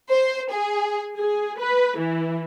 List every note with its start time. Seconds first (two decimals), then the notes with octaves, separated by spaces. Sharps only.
0.11 C5
0.52 G#4
1.17 G#4
1.60 B4
1.99 E3